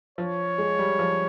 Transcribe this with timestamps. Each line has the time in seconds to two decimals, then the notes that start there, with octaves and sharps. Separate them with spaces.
0.18 F3 C#5
0.58 G#3
0.79 G3
0.99 F3